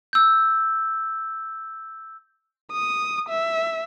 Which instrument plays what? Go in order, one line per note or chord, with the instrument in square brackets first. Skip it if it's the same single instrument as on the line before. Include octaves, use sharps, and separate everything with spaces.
[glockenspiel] E6 G6
[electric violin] D#6
E5